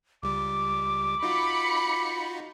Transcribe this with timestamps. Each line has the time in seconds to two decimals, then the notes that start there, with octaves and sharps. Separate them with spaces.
0.23 C#2 G3 D6
1.23 D#4 F4 F#4 B5 C#7